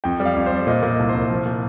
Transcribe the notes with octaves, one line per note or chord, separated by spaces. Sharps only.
F2 G5
G3
F5
F2
C5
G3
A#2 D#5
A#2 F5
D#5
C2
C5
C2
F3
A#2